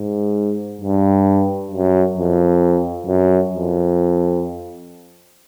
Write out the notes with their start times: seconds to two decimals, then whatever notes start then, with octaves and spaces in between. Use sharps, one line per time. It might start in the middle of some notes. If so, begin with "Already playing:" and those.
Already playing: G#2
0.82 G2
1.71 F#2
2.17 F2
3.07 F#2
3.53 F2